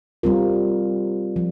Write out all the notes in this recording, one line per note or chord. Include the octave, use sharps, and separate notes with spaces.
G3 C4 F4 A#4
F3